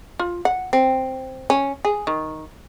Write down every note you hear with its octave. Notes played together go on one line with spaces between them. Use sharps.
F4
F#5
C4
C#4
G#4
D#3